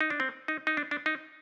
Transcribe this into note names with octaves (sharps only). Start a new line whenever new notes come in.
D#4
D4
C4
D#4
D#4
D4
D4
D#4